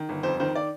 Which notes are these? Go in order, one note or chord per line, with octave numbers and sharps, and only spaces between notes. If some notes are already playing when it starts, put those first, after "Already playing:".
Already playing: D#3
G1
F2 C5
D#3 C5
D5